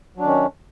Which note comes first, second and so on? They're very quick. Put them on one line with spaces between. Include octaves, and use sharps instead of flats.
F#3 D4 D#3 C#4